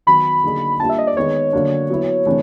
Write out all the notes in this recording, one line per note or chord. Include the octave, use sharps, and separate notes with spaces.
D#3 F#3 B3 B5
D3 F#3 A#3 D#4 G#4
G3 A#3 D4 F4 A5
E5
D#5
D5
D#3 G#3 B3 D#4 C#5
D3 F#3 A#3 D4
F#3 B3 E4
C3 E3 A3 D4